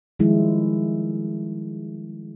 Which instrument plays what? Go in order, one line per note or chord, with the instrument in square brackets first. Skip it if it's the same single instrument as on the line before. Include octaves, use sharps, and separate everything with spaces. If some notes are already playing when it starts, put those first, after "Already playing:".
[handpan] D#3 F3 G3 G#3 E4